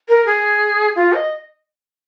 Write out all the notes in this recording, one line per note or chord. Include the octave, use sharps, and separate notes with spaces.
A#4
G#4
F4
D#5